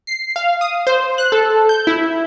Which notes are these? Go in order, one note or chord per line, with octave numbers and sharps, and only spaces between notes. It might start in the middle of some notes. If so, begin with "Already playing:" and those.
C7
F5
D#6
C5
F#6
A4
G6
E4